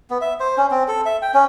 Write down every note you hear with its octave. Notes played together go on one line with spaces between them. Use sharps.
B3
E5
C5
C#4
C4
A4
E5
G5
C#4